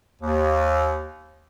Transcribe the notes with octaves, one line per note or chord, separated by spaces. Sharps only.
D#2